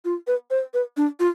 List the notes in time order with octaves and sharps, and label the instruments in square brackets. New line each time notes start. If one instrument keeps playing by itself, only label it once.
[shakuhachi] F4
B4
C5
B4
D4
F4